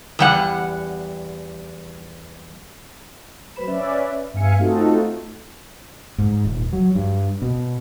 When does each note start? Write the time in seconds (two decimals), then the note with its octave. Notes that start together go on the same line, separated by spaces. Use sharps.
0.19 E2 G3 F#5
3.56 F#3 A3 B4 C5 B5 E7
3.67 C#4 B4 D5 E5
4.34 G2 B3 E5 F5 G#5 C#7
4.58 A3 C4 D#4 F4 F#4 A4
6.18 G#2
6.45 D#1
6.73 F#3
6.95 G2
7.42 B2